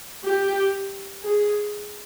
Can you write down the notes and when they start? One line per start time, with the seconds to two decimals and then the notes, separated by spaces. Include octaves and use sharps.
0.24 G4
1.23 G#4